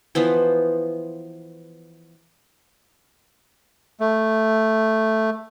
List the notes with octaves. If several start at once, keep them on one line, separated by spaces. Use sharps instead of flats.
E3 F3 B3 C5
A3